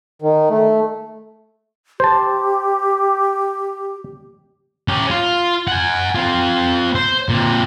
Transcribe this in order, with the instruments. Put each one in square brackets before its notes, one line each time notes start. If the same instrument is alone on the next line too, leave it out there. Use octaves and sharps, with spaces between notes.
[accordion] D#3
A3
[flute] G4 [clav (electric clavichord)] C5 A5
[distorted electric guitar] C#4 G4
F4
F#5 G#5
C4 F4
C5
A#2 C4